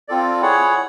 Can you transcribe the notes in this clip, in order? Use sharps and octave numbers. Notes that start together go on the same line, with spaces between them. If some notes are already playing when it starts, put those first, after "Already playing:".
C4 F4 A4 D5
E4 G#4 C#5 F#5